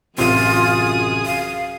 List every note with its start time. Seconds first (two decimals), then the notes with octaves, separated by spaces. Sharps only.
0.18 A1 F#2 C3 F4 G#4 D#6
1.26 F5